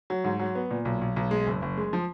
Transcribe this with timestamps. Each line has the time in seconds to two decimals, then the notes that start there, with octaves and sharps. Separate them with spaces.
0.10 F#3
0.24 G#2
0.39 F#3
0.55 B3
0.71 A#2
0.85 B1
1.01 B1
1.16 B1
1.31 G#3
1.47 F#1
1.62 F#1
1.77 G#3
1.93 F3